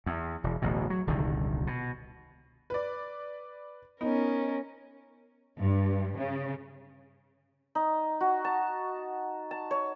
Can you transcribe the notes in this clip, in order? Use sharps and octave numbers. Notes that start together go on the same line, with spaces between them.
E2
E1
D1 A1 B2
F#3
D#1 C2 D3 D#3
B2
B4 D5
B3 C#4 D#4 A#4
G2
C#3
D#4
F#4
A5
A5
C#5